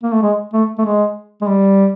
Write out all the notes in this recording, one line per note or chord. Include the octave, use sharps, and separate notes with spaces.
A#3
A3
G#3
A3
A3
G#3
G#3
G3